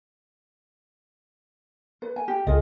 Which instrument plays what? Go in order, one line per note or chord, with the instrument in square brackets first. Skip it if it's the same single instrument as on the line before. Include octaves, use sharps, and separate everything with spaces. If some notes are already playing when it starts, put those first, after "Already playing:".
[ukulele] B4
G#5
G4
[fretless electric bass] C#2 [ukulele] F4 G#4 D#5